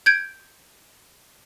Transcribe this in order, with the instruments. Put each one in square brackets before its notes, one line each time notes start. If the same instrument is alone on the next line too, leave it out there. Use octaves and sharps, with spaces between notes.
[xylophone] G6 G#6 D7